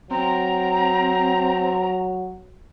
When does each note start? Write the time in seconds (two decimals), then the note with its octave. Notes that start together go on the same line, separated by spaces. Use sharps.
0.11 F#3 C4 A#5